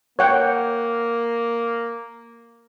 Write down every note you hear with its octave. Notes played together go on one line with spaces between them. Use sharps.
A#3 C#5 F#5 G5